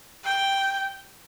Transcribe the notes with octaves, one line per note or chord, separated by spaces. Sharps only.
G5